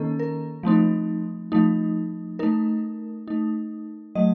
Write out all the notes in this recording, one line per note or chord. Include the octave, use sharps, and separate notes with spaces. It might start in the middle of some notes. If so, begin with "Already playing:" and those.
Already playing: D#3 A#3 C#4 A4
A#4
F3 A3 C4 D#4
F3 A3 D#4
A3 D#4 A#4
A3 D#4
F#3 A3 D#5